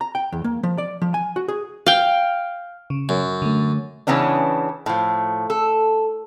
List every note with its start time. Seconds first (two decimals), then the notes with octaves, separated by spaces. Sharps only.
0.01 A#5
0.15 G5
0.32 E2
0.44 A#3
0.63 F3
0.78 D5
1.02 F3
1.14 G#5
1.36 F#4
1.48 G#4
1.86 F5 G5
2.90 C#3
3.09 F#2
3.42 D3 A3
4.07 C#3 E3 B3 C#4 D4
4.86 A2 F3
5.50 A4